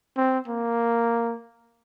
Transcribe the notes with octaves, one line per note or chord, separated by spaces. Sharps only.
C4
A#3